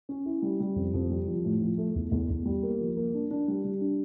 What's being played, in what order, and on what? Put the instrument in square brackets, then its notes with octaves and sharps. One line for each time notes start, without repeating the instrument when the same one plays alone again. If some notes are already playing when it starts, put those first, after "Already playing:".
[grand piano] C#4
E4
G3
G3
F2
F2
G3
F3
A2
F3
A3
E2
E2
E2
G3
A#3
F3
A#3
D4
D4
G3
G3
D4